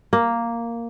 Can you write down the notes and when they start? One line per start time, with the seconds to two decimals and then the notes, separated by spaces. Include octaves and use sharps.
0.13 A#3